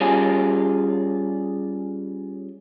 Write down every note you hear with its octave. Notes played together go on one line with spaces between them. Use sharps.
G3 C#4 F4 G#4